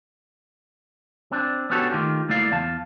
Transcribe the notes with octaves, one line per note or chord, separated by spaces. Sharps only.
C4 D4
B3 C#4 D4 F#4 G4 A4
D#3 A3 F4 G4
C#2 A3 A#3 E4 D5 F5
E2 F5 A5